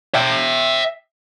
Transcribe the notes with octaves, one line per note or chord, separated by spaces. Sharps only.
E5 G5